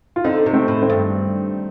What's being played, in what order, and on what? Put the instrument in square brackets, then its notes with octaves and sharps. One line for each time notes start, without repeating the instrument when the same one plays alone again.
[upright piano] F4
[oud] D3 [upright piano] C4 D#4
[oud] C3
[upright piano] A3 C4
[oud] A2
[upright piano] A3 C4
[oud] G2